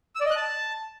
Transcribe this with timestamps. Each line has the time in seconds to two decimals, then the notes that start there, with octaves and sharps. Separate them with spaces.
0.15 E6
0.20 D5
0.26 D#5
0.31 F#6
0.36 A5